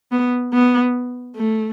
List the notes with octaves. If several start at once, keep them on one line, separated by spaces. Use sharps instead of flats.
B3
B3
A3